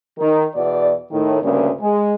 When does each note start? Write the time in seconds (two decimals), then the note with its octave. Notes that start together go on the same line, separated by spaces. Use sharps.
0.18 D#3
0.55 E2 B2 D5
1.11 A2 D#3
1.41 D2 G2 C#3 A#3 D4
1.81 G#3